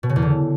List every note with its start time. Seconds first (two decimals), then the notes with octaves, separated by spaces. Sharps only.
0.03 B2
0.09 C#3
0.16 E2
0.22 D3